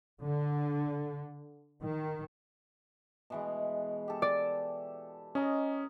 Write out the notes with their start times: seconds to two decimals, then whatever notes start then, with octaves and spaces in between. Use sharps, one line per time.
0.23 D3
1.82 D#3
3.30 B2 E3 G#3
4.08 G4 A4
4.22 D5
5.35 C#4 D#5 A#5